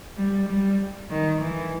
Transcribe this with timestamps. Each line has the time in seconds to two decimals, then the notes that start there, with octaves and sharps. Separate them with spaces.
0.17 G3
0.48 G3
1.10 D#3
1.41 E3